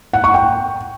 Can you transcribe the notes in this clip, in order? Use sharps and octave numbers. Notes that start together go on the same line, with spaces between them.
F#5
C#6
G5